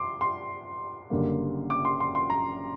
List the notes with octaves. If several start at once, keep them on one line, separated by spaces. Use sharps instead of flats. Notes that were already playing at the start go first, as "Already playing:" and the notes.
Already playing: C6 D6
C6
F#1 F#2 D3 G3 A#3
D6
C6
C6
C6
A#5